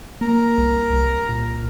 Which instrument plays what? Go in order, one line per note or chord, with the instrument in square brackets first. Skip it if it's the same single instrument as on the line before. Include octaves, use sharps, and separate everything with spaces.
[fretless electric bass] A#3 [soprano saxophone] A#4
[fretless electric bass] C2
C2
A#2